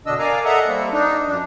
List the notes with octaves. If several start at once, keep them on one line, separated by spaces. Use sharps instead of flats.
E2 B2 D3 D4 D#5 E6
A#4 D5 F5 G#5 A#5
A4 D#5 E5 F#5 A#5
G3 A#3 C4
D4 D#4
F#2 F3 D4